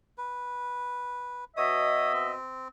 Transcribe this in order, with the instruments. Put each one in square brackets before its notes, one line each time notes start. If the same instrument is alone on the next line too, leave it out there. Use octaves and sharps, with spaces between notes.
[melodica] B4
[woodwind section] B2 D#5 E5 [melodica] C#5 D#6
[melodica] C4